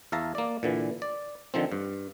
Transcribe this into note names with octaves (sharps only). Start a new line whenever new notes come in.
E2 E5 F5 A5 A#5
A#3 D5
A#2 D3 E3
D5
D3 D#3 F3 C4
G2